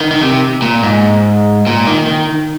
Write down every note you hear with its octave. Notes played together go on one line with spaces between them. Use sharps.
D#3
D#3
C3
A#2
G#2
A#2
D#3
D#3